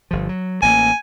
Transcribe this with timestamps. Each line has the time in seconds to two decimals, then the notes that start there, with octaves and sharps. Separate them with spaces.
0.11 G1 F3
0.29 F#3
0.62 A1 A#3 G#5